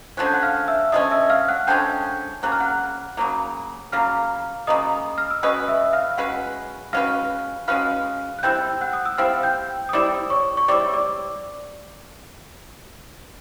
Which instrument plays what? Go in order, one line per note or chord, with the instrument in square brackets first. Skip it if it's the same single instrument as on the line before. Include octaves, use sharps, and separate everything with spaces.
[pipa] D3 F3 G#3 C#4 [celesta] F#6
[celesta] G6
F#5 F#6
F5 F6
E5 E6
[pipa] D3 F3 G#3 C#4 [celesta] D#5 D#6
[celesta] E5 E6
F5 F6
F#5 F#6
[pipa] D3 F3 G#3 C#4 [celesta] G5 G6
[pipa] C#3 F#3 A#3 [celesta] F#6
[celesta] F6
F#5 F#6
[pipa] C#3 F#3 A#3
[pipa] C#3 F#3 A#3 [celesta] F5 F6
[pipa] C#3 F#3 A#3 [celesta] D#5 D#6
[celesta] F6
E6
[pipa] G#3 C#4 F#4 B4 [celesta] D#5 D#6
[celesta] E5 E6
F5 F6
[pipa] G#3 C#4 F#4 B4 [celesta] F#5 F#6
[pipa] G#3 C#4 F#4 B4 [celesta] F5 F6
[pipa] G#3 C#4 F#4 B4 [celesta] F5 F6
[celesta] F#6
[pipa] G3 C4 E4 [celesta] G5 G6
[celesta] F#5 F#6
D#6
E6
[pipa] G3 C4 E4 [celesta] F5 F6
[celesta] G5 G6
D#6
[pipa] G3 C4 E4 [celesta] D5 D6
[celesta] C#5 C#6
C#6
[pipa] G3 C4 E4 [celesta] D5 D6
[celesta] D5 D6